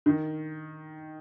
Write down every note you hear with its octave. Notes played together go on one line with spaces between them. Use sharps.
D#3